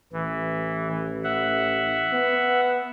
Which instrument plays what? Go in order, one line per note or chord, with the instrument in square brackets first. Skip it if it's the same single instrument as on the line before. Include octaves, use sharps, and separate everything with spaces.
[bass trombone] A1 [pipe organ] E3
[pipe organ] E5 F#5
[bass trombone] B3